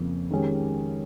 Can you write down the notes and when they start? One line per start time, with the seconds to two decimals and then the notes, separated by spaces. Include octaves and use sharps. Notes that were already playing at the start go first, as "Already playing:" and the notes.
Already playing: F2 C#3 F3 A#3
0.31 D#3 G#3 C#4 G4